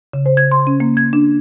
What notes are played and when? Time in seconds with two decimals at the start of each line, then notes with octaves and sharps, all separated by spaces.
0.14 C#3
0.26 C5
0.37 G#6
0.52 C6
0.67 C#4
0.80 A#3
0.97 G#6
1.13 D4